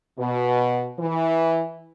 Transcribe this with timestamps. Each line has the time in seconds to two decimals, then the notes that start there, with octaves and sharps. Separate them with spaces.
0.18 B2
0.99 E3